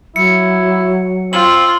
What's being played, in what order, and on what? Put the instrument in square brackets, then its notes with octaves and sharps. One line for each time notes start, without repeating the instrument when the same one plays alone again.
[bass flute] F#3 [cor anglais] E4 [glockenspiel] C#7
[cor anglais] C4 [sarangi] F4 [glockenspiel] F#7